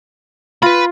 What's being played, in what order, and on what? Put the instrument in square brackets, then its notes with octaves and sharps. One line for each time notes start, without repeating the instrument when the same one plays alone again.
[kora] F4 [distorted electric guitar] B4 B5